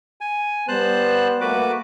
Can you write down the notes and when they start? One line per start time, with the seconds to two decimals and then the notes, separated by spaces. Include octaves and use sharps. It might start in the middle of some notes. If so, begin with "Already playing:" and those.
0.21 G#5
0.68 G3 B3 C5 A5 F#6
1.41 A3 A#3 F#4 B4 D6